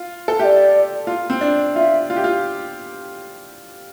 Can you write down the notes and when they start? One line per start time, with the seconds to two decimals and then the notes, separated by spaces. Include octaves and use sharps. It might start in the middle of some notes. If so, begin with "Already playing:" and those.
Already playing: F4
0.28 A4
0.40 G4 E5
0.45 D5
1.07 F4
1.30 C4
1.41 D4
1.75 F4 E5
2.10 F4
2.16 G4
2.24 F4